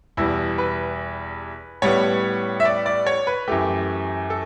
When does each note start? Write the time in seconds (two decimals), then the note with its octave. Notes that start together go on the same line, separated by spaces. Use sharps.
0.17 E2 B2 G3 E4
0.58 B4
1.82 A2 G3 B3 C#5
2.60 E5
2.65 D5
2.86 D5
3.07 C#5
3.27 B4
3.48 F#2 E3 A3 G4
4.30 A4